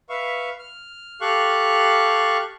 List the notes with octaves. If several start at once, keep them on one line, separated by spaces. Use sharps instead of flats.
B4 E5 F5 C#6
F6
G4 A4 F5 C#6 F#6